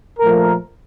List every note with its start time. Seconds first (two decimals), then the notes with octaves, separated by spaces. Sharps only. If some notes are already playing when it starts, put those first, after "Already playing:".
0.19 A#2 F3 A3 A#4